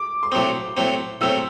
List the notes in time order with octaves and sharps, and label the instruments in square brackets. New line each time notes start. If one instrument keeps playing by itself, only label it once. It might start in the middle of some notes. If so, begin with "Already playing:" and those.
Already playing: [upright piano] D6
C6
[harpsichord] A2 F#3 C4 [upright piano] D6
[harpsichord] A2 F#3 C4
[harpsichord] A2 F#3 C4 [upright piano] E6